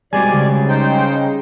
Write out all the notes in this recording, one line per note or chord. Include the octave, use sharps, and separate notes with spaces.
B2 G3 G#3 C4 D5 G#5
C#3
D#4 C5 G5